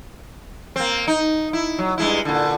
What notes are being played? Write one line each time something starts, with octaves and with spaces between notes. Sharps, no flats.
A#3 C4
D#4
E4
F#3
G2 G#3 E4
A#2 D3